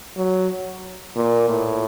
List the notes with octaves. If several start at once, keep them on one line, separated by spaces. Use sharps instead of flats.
F#3
A#2
A2